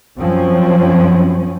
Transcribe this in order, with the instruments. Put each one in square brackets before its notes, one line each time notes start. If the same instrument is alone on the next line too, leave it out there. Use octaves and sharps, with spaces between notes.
[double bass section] F#2 F3 C4 C#4